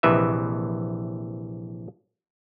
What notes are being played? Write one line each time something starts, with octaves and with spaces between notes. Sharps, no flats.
A#1 C3 E3 B4 D#5 E5